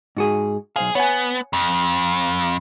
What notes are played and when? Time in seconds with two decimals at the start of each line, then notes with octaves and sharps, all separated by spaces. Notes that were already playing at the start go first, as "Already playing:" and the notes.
0.17 G#2 F#4 G#4
0.76 B1 G#4 C5 F5
0.95 B3 C#5 F#5 G#5
1.53 F2